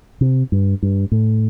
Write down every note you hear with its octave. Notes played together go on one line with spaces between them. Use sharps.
C3
G2
G2
A2